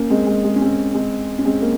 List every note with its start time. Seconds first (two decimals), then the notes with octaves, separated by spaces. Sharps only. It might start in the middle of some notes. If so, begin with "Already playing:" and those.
Already playing: A#3 C#4
0.10 G#3 C4
0.27 G#3
0.44 G#3
0.56 C#4
0.62 G#3 C4
0.94 G#3 C4
1.39 C#4
1.45 G#3 C4
1.61 A#3